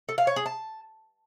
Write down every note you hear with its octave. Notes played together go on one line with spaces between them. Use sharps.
A4
F5
C#5
G#4
A5